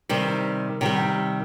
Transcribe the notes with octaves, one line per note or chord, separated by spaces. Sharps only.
C3 D#3 G3
C3 D#3 G3